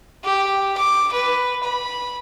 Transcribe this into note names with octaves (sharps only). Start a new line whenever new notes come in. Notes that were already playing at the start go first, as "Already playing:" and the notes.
G4
D6
B4
B5